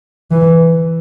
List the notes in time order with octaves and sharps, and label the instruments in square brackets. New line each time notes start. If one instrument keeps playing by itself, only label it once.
[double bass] E3